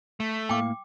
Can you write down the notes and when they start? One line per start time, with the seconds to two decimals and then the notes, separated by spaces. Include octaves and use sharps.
0.20 A3
0.49 A2 A#3 F5 G5 D6